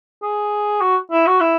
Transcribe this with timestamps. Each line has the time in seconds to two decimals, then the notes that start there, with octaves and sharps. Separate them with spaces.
0.23 G#4
0.81 F#4
1.11 E4
1.27 F#4
1.40 E4